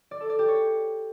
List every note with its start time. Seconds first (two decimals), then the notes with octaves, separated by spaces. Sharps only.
0.11 D5
0.20 A4
0.30 D5
0.39 G4
0.48 C#5